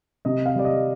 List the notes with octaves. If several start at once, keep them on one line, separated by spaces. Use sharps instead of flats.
C3 D#5
F5
G3 D5
D#5